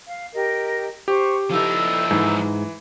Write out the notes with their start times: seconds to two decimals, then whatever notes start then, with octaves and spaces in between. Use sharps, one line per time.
0.05 F5
0.33 G4 A#4 D#5
1.08 G4 C5 C#6
1.50 F3 D#4 E4 A4 E6
2.11 G#2 E3